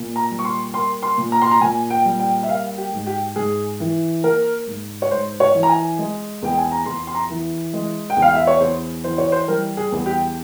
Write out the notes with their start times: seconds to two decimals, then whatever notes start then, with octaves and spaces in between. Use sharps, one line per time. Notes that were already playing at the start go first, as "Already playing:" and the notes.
Already playing: A#2
0.16 A#5
0.31 G3
0.39 C#6
0.45 C6
0.74 A#3 C6
1.03 C6
1.18 A#2
1.32 A#5
1.42 C6
1.51 A#5
1.61 A#2 G#5
1.90 G5
2.05 G3
2.20 G5
2.43 E5
2.49 A#3 F5
2.78 G4
2.93 G#2
3.07 G4
3.36 G#2 G#4
3.80 E3
4.24 A#3 A#4
4.67 G#2
5.02 C#5
5.11 G#2 C5
5.40 C#5
5.55 E3
5.63 A#5
5.69 G#5
5.99 G#3
6.42 E2 G5
6.58 G#5
6.72 A#5
6.85 E2 C6
7.07 C6
7.15 A#5
7.30 E3
7.73 G#3
8.10 G5
8.17 E2
8.22 F5
8.35 E5
8.47 C#5
8.60 E2 C5
9.04 E3 C5
9.18 C#5
9.32 C5
9.48 G3 A#4
9.77 G#4
9.92 E2
10.06 G4